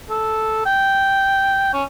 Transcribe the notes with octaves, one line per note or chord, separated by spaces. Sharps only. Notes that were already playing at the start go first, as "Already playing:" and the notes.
A4
G5
C#4